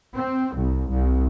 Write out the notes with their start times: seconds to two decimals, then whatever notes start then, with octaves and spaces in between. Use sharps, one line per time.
0.15 C4
0.55 C2
0.90 C2